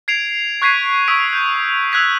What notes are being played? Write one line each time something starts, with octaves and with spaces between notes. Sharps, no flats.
G#6 C7 D7 F7
C#6 F#6 G#6 B6 C7 D#7
C#6 D#6 E6 B6 D7
G6 F7
E6 F#6 G#6 B6 F7